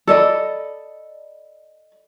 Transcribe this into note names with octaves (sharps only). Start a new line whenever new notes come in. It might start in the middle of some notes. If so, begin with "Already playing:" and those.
A4 D5 D#5 B5